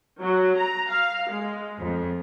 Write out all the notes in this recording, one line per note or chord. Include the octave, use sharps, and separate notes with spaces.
F#3
A#5
F5
G#3
F2